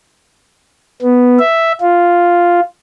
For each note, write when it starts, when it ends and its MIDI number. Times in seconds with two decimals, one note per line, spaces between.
1.02 1.38 59
1.39 1.72 76
1.81 2.60 65